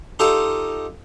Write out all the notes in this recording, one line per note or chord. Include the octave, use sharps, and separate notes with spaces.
D#4 F4 G4 A4 D#5